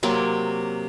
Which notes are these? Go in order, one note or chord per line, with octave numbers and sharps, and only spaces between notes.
C3 F#3 A#3 C4